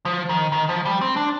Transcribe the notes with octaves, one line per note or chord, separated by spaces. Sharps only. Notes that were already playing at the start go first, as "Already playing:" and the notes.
F3
D#3
D#3
F3
G3
C4
D4